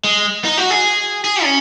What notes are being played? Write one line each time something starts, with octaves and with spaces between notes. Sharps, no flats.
G#3
D#4
F#4
G#4
G#4
C#4